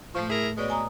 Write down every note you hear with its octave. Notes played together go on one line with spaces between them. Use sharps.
A2 F3 A3
E4 G#4 A#4
B2 G#3 B4 C#5 D5
G#5 A#5 D#6